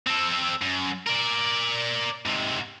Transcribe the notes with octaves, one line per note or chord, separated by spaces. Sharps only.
C4 A4
F#2
A#4 D5
G#2 C3